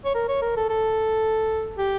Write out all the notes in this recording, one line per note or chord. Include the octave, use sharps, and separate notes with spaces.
C#5
A#4
C#5
A#4
A4
A4
G4